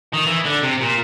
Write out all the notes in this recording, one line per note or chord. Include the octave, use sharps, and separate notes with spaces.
D#3
E3
D3
C3
A#2